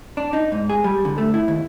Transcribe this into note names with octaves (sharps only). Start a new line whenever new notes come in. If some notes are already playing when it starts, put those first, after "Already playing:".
D4
D#4
G#2
G#4
G3
D3
A3
E4
D#2